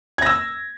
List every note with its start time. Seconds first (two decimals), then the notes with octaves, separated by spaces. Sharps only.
0.18 G#6
0.22 A#6
0.26 E6